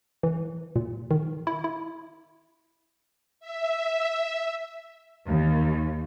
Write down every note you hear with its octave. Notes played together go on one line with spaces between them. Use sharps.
E3
A#2
D#3
E4
E4
E5
D#2